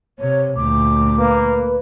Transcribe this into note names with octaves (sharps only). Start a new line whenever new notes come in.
C3 C#5
D2 A#2 D6
A#3 B4